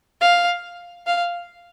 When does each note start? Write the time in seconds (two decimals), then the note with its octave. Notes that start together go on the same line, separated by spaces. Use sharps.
0.21 F5
1.07 F5